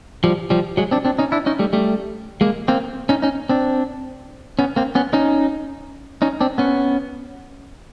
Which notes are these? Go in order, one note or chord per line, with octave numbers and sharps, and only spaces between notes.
F3 G3
F3 G3
F#3 G#3
C4 D4
C4 D4
C#4 D#4
D4 E4
C#4 D#4
G3 A3
G3 A3
G#3 A#3
A#3 C4
C#4 D#4
C#4 D#4
C4 D4
B3 C#4
A#3 C4
B3 C#4
C#4 D#4
C#4 D#4
C4 D4
B3 C#4